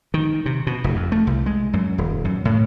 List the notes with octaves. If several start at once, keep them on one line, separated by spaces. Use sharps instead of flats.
D#3
C3
B2
F1
F2
A3
C2
G#3
F#2
D#1
F#2
A2